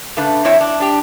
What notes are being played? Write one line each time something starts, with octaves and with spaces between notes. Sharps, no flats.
C#3 A3 D4 B4
E2 C4 E4 C#5 E5
D4
D4 G4